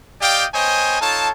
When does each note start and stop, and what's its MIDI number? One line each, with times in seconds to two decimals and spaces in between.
0.22 0.45 67
0.22 0.45 74
0.22 0.45 75
0.22 0.45 77
0.22 0.45 79
0.54 0.99 59
0.54 0.99 72
0.54 0.99 73
0.54 0.99 75
0.54 0.99 79
0.54 0.99 80
1.01 1.29 63
1.01 1.29 65
1.01 1.29 69
1.01 1.29 73
1.01 1.29 81